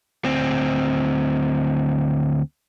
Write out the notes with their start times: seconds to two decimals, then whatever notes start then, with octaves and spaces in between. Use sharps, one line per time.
0.25 D2 C4